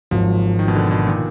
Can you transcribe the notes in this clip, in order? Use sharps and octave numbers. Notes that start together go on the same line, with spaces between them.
G#1 G#2 F3 F#3
D#3
B2
D3
B2
A#2 D#3